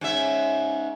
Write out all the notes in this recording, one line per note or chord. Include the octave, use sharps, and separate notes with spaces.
G#2 C#4 E5